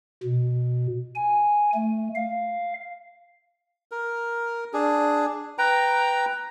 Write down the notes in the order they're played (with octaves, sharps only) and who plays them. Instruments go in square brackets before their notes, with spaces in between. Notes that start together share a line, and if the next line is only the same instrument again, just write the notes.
[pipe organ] B2
G#5
A3
F5
[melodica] A#4
D4 G#4
B4 G5 A#5